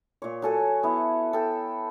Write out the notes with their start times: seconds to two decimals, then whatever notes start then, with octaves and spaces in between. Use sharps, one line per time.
0.22 A#2 C#5
0.42 F#3 A4 G#5
0.83 B3 E4
1.33 A4 G5